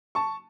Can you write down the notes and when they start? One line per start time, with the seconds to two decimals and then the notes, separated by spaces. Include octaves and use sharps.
0.15 A5 C#6